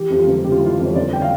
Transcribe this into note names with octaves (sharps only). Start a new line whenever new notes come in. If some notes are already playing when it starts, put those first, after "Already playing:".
Already playing: E3 G4
F2 G4
F4
G1
C#3 G4
F4
E4
E3 F4
F2
C#5
G1 D5
G5
F5